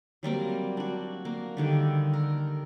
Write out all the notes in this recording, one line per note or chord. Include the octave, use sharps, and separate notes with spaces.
F#3 G3 A#3 C4
D4 F#4
A#3
D3 D#3 G3
A#4